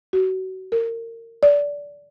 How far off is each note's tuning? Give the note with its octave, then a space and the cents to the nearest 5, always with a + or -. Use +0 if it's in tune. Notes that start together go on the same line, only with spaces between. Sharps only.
F#4 +30
A#4 -25
D5 -20